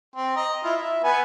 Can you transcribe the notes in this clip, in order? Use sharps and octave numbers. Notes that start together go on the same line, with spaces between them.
C4
D#5 A#5
E4 F4
E5
B3 B4 G#5